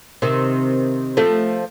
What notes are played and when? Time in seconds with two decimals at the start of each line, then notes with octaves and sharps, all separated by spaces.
0.22 C3 D#3
1.17 F3 A3